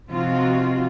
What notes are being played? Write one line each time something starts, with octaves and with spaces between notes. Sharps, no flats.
C3 F3 C4 D#4 F4 F#4